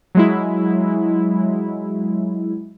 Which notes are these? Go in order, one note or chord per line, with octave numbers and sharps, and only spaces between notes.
F#3 G#3 E4